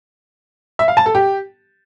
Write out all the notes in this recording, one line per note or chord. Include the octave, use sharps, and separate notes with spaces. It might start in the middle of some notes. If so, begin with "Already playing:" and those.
E5
F5
A5
A4
G4